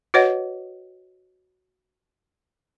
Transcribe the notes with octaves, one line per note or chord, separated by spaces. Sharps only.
F#4 B4 C#5 D#5 F#5